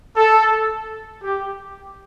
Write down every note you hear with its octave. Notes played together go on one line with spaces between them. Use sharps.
A4
G4